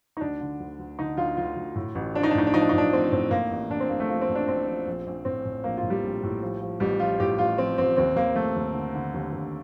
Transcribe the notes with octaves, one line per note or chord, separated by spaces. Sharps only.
D#4
D2 D4
D3
D2
D2
D3 D#4
D2 F4
D2 F4
D2
A2
A1
F3 D4
D#4
D4
A2 D#4
D4
F3 D#4
D4
D#4
A2
D4
A1 C4
A2 C4
A2 A#3
A1
A1 D4
C4
A1 A#3
A3
F3 A#3
C4
A1
D4
A1 C4
F3
A#1
A#1
A2 C4
A2
A#1 A#3
F4
A2
G3
A#1
A2
F3
F3
A1 G3
F3 F4
A2 G4
A1 F4
F3 C4
A1 C4
D#2 C4
D#2 A#3
D#2 A3
D#2
D3
D3
D#2
D#2